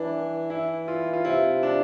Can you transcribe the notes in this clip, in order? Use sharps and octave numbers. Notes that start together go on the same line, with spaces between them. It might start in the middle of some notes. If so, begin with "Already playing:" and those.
Already playing: E3 D4
E4
F4
F4
C3 E4
D4